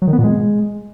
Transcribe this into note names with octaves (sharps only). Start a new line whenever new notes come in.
F#3
D#3
B3
A#2
G#3